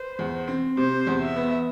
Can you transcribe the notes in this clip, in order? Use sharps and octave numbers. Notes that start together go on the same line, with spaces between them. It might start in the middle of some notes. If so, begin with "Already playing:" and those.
Already playing: B4 C5
E2
C4
C3 C5
E2
E5
B3